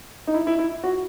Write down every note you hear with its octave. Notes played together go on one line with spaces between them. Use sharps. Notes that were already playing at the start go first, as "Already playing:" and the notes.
D#4
E4
E4
E4
F#4